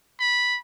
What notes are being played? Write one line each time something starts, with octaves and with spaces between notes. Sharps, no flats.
B5